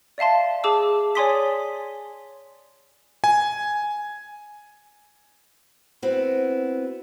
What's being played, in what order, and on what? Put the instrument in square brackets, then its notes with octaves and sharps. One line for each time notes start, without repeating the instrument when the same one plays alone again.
[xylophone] D5 E5 F5 A5 C6
G#4 A5 D6 E6
C#5 D5 G#5 C6 D#6 B6
[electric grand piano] G#5
[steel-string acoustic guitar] B3 C4 E4 F#4